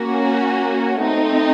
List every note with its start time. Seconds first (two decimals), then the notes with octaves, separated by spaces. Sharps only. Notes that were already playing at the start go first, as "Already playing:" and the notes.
Already playing: A#3 C#4 F#4
0.99 A3 C4 D#4